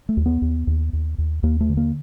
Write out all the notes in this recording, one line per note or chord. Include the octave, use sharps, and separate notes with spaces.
A3
D#2
B3
D#2
D#2
D#2
D#2
D#2 A#3
A3
D3
A#3